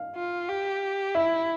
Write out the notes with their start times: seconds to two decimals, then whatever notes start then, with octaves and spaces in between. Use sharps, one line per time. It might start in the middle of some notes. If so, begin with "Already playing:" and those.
Already playing: F5
0.16 F4
0.49 G4
1.15 E4 E5